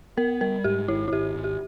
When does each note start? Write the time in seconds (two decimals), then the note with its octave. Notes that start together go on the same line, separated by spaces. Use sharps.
0.17 B3 A#4
0.41 G3 A#4
0.64 G#2 G4
0.88 G#1 E4
1.08 E4
1.12 G#1 G4
1.36 G#1
1.44 G4